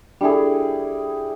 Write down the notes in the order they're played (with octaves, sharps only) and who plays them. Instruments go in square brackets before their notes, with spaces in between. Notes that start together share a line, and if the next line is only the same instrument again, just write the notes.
[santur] G3 E4 G#4 [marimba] D4 A4